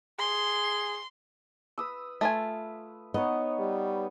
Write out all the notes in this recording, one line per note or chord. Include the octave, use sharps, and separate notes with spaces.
G#4 C6
B4 D#6 E6
A3 F4 G#5
B3 D#4 C#5 D#5
G3